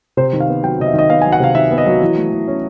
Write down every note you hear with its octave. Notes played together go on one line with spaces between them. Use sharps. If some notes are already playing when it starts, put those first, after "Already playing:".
C3 C5
D#3
F5
B3
F#3 G5
C3 D#5
E5
D#3 D#5
B3 F5
G#5
F#3
F#5
C3 F5
D#3 E5
B3
D#5
F#3
E3
A3
E3
C#4